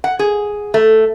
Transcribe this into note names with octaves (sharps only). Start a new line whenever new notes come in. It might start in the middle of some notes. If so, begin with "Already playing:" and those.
F#5
G#4
A3